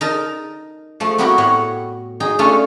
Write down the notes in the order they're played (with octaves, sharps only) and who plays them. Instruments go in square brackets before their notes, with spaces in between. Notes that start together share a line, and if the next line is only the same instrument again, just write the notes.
[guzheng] D#4 A#4 A5
F3 A3
B3 C4 E4 F#4 G4 A#4
A2 C#5 F#5
D#4 G#4 G5
A3 C#4 D4 F4 A4